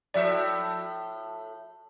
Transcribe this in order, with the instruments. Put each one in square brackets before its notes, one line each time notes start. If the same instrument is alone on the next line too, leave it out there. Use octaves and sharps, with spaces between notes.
[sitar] A2 F3 E5 [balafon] D5